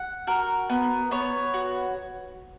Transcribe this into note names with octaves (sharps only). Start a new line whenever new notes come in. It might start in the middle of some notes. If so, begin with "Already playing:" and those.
Already playing: F#5
F#4 A#4
B3
B3 C#5
F#4